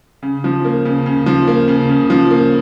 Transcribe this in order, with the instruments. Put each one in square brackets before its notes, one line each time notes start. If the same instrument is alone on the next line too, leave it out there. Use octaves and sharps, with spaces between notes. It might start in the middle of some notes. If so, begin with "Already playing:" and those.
[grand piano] C#3
F3
A#3
C#3
C#3
F3
A#3
C#3
C#3
F3
A#3